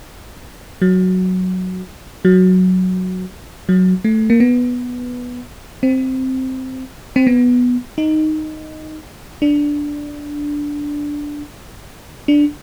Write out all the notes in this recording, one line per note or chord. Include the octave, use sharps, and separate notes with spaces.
F#3
F#3
F#3
A3
A#3
B3
C4
C4
B3
D#4
D4
D4